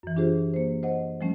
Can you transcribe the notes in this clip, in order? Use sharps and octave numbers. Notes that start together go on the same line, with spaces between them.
F#2 E3
D4 F4 G4 G#4 C5
A#3 C5
C5 D#5 F#5
F3 G3 A3 C#4